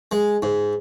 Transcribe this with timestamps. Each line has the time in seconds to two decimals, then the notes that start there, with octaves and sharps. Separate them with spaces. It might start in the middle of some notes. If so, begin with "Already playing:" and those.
0.12 G#3
0.42 G#2